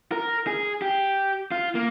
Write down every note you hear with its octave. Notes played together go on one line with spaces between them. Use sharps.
A#4
G#4
G4
F4
A#3